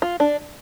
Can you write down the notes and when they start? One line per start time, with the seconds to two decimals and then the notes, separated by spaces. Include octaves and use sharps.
0.02 F4
0.20 D4